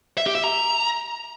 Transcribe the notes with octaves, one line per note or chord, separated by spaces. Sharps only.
E5
G4
E5
A#5